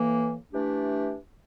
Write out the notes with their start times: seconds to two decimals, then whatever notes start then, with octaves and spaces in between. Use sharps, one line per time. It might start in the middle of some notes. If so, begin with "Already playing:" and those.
Already playing: A2 E3 A#3
0.52 E3 A3 D4 G4